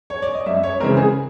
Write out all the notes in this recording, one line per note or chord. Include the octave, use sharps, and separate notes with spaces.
C#5
D5
D#5
F#2 E5
C#5
C#3 E3 G#3 C4 A#4
G#4